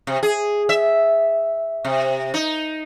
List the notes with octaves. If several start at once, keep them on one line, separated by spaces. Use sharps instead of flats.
C3
G#4
E5
C3
D#4